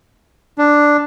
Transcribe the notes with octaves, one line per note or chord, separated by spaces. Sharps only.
D4